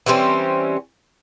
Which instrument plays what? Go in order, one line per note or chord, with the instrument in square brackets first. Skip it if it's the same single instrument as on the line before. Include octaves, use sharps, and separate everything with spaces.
[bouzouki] E3 G3 C4 C#4